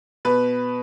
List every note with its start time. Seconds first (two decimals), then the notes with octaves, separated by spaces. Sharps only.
0.25 B2 B4